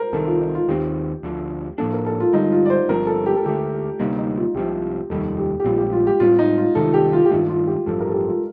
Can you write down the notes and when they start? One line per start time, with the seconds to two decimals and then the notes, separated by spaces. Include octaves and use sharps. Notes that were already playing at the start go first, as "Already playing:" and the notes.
Already playing: A#4 C5
0.13 C2 C3 D#3 A4
0.26 F4
0.40 D#4
0.55 F4
0.68 D#2 D#3 G3 C4 G4
1.23 D2 D3 F3
1.78 A2 F3 A#3 D4 A4
1.93 A#4
2.06 A4
2.20 F4
2.33 G2 D3 G3 D#4
2.52 F4
2.66 D5
2.70 C5
2.89 G1 G2 F3 C4 A#4
3.07 A4
3.26 G4
3.36 A4
3.45 D2 D3 A3 G4
4.00 D2 C3 G3 A#3 D#4
4.18 D#4
4.36 F4
4.55 C2 C3 F3 G4
5.10 F1 D#2 D#3 G3 A4
5.38 G4
5.60 G4
5.64 A#1 A#2 G3 C4 F4
5.78 G4
5.92 F4
6.07 G4
6.20 A2 G3 C4 F4
6.39 D#4
6.58 F4
6.75 C2 C3 D#3 A3 A4
6.94 G4
7.13 F4
7.25 G4
7.31 G2 D#3 A3 F4
7.49 F4
7.67 G4
7.86 A1 G2 F3 A4
8.00 A#4
8.09 A4
8.14 G4
8.28 F4